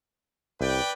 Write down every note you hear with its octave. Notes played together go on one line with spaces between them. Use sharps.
C2 B4 D5 G5